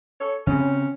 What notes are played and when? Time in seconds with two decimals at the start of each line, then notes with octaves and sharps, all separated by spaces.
0.20 A4 C#5
0.47 C#3 C4 C#4